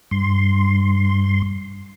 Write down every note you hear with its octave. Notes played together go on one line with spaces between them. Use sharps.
G2 C6